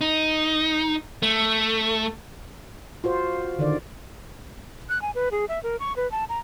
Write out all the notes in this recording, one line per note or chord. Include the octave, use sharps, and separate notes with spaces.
D#4
A3
F4 F#4 C5
D3 D#3 D5
F#6
G#5
B4
G#4
E5
A#4
C#6
B4
A5
A#5